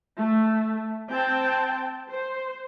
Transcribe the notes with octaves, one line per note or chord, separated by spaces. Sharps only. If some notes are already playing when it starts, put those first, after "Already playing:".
A3
C4 G5 A5
C5